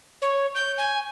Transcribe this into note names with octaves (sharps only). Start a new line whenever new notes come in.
C#5
G6
G#5